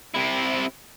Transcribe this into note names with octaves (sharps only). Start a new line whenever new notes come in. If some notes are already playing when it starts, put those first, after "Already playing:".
C3 E4